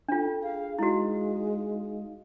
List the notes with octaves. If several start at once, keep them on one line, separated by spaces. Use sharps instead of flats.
D4 F4 A4 G5
G#4 F5
G#3 D#4 E4 F#4 F5